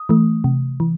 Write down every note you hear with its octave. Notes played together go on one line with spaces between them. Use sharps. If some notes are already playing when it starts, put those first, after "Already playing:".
Already playing: D#6
E3 A3
C3
E3